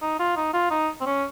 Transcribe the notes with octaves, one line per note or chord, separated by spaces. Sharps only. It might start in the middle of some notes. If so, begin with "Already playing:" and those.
D#4
F4
D#4
F4
D#4
C4
C#4